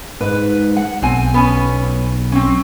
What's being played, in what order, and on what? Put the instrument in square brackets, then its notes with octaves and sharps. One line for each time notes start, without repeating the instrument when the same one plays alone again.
[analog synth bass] G#2 [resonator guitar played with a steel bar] B4
[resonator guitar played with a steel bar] F#5
[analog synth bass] B1 [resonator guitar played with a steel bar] C4 G#5
[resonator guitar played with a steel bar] B3 C#4 G#5
C4 C#4